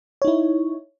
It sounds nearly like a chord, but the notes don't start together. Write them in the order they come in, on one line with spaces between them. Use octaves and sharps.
C#5 D#4 E4